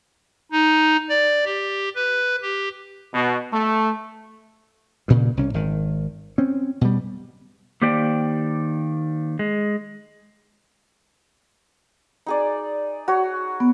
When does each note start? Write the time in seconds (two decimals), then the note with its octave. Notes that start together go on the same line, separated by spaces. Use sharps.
0.52 D#4
1.09 D5
1.45 G4
1.95 B4
2.42 G4
3.14 B2
3.52 A3
5.08 G2 A#2 C#3
5.37 C2 C#4
5.54 G#1 D#3
6.38 C4 C#4
6.81 B2 G3
7.82 D#3 A#3 G4 C5 D5 G5
9.39 G#3
12.26 D#4 G#4 D5
13.08 F#4 C#5
13.60 B3